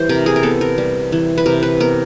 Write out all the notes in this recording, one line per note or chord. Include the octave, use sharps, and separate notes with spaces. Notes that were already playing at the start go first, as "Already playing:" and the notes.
Already playing: E3 G3 C5
C3 A#4
G#4
A#4
B3 A4
A#4
G3
E3
B4
C3 A#4
B4
B3 A#4